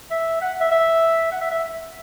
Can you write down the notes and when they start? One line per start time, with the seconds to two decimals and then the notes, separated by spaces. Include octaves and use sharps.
0.11 E5
0.41 F#5
0.60 E5
0.71 E5
1.32 F#5
1.41 E5
1.51 E5